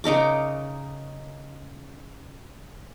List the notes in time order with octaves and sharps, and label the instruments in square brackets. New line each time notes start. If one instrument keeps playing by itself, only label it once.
[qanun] C#3 D#4 A#4 D6